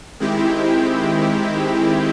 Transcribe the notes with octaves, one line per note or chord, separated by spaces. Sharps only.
D#3 G#3 C4 E4 G4